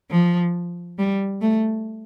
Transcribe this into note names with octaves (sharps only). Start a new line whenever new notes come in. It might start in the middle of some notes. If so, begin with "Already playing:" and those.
F3
G3
A3